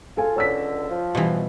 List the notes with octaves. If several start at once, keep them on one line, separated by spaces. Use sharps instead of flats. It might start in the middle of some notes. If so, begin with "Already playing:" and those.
F4 A4 G#5
C#2 D3 C#5 E6 B6
F3
B2 E3 G3